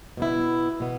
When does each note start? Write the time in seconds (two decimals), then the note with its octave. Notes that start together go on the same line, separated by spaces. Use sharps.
0.17 B2 B3 E4
0.80 B2 B3